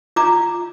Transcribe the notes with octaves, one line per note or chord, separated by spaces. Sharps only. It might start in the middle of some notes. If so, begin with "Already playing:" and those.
F4 A#5 D6